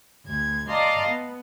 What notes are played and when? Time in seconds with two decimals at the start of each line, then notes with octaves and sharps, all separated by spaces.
0.25 D2 G#6
0.69 D5 D#5 F5 A5 A#5 C6
1.08 B3